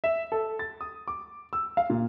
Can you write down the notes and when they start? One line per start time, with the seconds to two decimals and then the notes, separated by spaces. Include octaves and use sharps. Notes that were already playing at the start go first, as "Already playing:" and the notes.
0.04 E5
0.32 A4
0.59 A6
0.81 D#6
1.08 D6
1.53 E6
1.77 F5
1.90 A#2